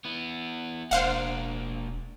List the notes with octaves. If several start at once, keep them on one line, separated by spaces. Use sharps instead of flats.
B3 E4
E1 A#3 D4 C5 F5 F#5